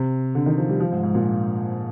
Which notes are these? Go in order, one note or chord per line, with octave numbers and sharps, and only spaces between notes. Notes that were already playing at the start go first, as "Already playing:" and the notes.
Already playing: C3
D3
D#3
F3
G3
F3
G#2
G#2
A#2